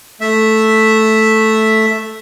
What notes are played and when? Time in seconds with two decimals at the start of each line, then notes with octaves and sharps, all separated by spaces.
0.21 A3 E5